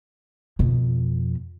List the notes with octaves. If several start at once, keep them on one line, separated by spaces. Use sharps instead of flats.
F2 B2